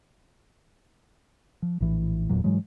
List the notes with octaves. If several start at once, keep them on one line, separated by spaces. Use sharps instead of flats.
F3
A#1 A2 E3
F#1 E2 A#2 F#3
G#2 E3 F#3 G#3